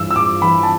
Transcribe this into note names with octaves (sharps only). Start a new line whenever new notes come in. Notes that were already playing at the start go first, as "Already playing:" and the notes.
Already playing: G2 E3 E6
E6
G2 D6
E3 B5
A5